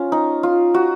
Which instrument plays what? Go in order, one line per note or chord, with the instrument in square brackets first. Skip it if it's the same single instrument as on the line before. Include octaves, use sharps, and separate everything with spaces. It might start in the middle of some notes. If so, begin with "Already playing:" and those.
Already playing: [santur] C#4 F4
D#4
F4
F#4